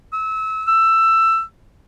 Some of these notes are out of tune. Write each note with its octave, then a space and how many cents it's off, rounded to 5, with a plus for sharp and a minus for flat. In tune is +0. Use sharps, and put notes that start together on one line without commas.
E6 -30
E6 +15